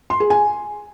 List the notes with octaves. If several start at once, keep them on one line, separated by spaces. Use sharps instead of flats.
C6
G#4
G#5